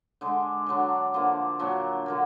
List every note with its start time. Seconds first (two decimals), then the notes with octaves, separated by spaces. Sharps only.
0.21 D3 G#3 D4
0.66 D3 F#3 D4
1.14 D3 F3 A#3
1.59 A#2 F#3 D4
2.06 D3 F#3 A#3